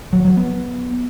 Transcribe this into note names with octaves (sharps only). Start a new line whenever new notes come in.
F#3
F#3
B3